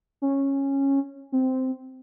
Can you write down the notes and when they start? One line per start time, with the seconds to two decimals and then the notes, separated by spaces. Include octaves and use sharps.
0.22 C#4
1.32 C4